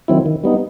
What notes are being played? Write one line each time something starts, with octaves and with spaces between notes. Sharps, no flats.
D#3 F#3 C4 E4
D#3
G3 B3 D#4